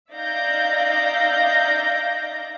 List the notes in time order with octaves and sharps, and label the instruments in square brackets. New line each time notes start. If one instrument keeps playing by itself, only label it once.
[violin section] D#4 D5 E5 F5 G6 A#6